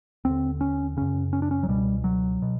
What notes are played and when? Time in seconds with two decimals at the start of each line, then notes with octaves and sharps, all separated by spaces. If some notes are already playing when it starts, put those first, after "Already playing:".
0.25 D#2 D3 C4
0.61 C#4
0.97 F#2 C#3 C#4
1.33 C#4
1.42 D4
1.51 C#4
1.63 F#3
1.68 C#2 B2 G3
2.04 F#3
2.42 B2